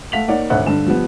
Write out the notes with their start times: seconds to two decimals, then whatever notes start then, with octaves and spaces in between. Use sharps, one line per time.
0.12 A3 F5 F#5 B6 F7 F#7
0.28 A#3 D#4 C#5 D5 F#5
0.50 G#1 D2 C#5 E5 F#5 F#6
0.66 G2 D3 E7
0.86 F3 G3 B3